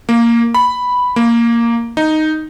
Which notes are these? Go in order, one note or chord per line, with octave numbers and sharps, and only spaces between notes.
A#3
B5
A#3
D#4